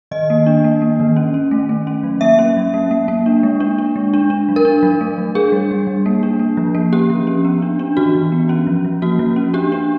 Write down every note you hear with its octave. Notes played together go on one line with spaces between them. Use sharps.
D#3 D#5
A#3
D4
A#3
A#3
D#3
C#4
C#4
A3
A3
C#4
F#3
A#3 E5
C#4
F#3
A#3
A#3
A#3
D4
G#3
D4
D4
G#3
D4
D4
F#3
A#4
D4
F#3
A3
F#3
D4 G#4
G3
G3
G3
A#3
D4
A#3
F3
A#3
C#4 G4
F3
C#4
B3
D4
D4
E3 F#4
E3
B3
C#4
F3
F3
A#3 F#4
F3
C#4
D4 G4
D4